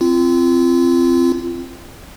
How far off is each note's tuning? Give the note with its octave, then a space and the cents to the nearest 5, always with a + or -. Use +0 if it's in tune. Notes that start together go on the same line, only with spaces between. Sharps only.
C4 +0 F4 -30